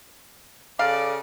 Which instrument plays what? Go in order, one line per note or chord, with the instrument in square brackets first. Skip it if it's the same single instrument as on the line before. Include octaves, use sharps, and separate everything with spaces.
[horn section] C#3 A4 D5 [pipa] F5